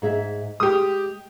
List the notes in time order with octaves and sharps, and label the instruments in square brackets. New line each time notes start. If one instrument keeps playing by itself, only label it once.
[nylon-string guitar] G#2 G#4 E5
[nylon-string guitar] G#3 [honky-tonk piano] G4 D#6